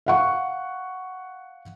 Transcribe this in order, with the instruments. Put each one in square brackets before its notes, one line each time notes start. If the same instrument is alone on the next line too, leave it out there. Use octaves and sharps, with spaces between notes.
[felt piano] F5 F#5 C#6